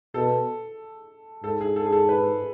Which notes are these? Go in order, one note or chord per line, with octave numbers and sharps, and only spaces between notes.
B2 A4
G#2 A4
G#4
A4
G#4
A4
B4